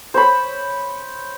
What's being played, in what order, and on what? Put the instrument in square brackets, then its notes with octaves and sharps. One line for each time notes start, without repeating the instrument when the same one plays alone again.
[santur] C5 C#5 B5